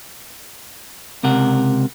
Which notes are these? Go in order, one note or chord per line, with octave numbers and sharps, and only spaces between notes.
C#2 C3 A#4 F#5